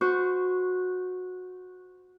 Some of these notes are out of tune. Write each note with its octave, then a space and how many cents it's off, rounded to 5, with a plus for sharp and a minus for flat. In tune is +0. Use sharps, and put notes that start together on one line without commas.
F#4 -15 C5 -25 C#6 +0